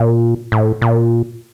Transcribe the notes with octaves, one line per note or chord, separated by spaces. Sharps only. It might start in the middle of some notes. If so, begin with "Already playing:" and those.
Already playing: A#2
A2
A#2